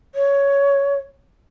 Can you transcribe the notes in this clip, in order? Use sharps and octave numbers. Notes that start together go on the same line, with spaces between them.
C#5